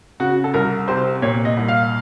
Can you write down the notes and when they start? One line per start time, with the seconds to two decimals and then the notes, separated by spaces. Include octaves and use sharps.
0.20 C#3 F#4
0.44 A4
0.54 C2 A#4
0.88 C3 C5
1.22 A#2 C#5
1.45 D#5
1.57 C2
1.68 F5